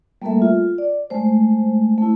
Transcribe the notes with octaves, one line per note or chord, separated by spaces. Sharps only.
G3 A3 A#3 A4 A#4 E5
F4
D5
G#3 A3 C5
A3 E4